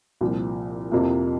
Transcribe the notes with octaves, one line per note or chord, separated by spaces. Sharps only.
C2 A#2 F3
F2 C3 F3 A#3 E4